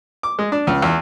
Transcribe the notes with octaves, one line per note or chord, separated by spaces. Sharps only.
D6
G#3
D4
C#2
E2